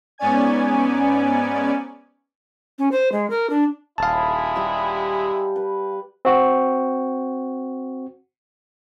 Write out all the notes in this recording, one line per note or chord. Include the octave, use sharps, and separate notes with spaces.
G#2 B3 C#4 D5 G#5 G#6
C#4
C5
G#3
A#4
D4
D#1 E3 G#3 E4 F5 A5
G3 G4
B4
C4 F#4